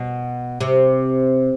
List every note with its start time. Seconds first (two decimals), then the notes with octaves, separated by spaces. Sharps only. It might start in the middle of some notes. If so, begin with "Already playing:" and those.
Already playing: B2
0.61 C3